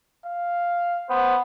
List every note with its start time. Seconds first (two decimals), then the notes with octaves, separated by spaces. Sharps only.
0.25 F5
1.10 B3 C5